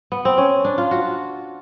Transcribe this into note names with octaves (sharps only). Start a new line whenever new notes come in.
B3
C4
C#4
D4
F4
F#4